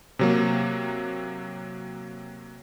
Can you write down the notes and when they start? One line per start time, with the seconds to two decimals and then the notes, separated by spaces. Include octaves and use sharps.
0.19 C3 F#3 A#3